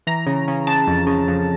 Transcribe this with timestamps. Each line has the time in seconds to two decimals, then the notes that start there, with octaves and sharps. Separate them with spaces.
0.07 E3 A#5
0.27 C#3
0.48 C#3
0.67 C#3 A5
0.87 F2
1.07 C#3
1.28 F2